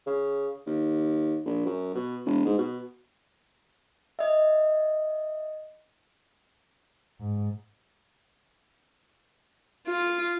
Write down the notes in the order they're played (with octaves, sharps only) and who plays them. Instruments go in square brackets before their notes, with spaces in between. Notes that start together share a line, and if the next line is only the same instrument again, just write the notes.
[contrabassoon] C#3
D#2
A#1
F#2
B2
E1
G#2
B2
[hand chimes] D#5 E5
[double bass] G#2
[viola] F4